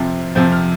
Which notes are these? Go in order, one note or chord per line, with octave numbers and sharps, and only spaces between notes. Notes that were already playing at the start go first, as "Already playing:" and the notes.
Already playing: F2 C3 F3 C4
F2 C3 F3 C4 G6
F6